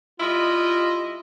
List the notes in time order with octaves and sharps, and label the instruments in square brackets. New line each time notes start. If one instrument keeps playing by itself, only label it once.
[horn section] G3 E4 D#5 [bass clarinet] F4